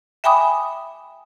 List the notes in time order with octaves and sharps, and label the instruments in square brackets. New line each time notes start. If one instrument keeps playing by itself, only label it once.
[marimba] E5 G5 G#5 B5 D6 D#6